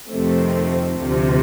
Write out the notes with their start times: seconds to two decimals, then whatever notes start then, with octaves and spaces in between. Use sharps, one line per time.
0.11 F2 C3 D#3 A3 C4
0.98 D2 C3 F3